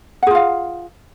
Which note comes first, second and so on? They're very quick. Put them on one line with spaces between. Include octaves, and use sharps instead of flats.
F#5 G#4 F4 F5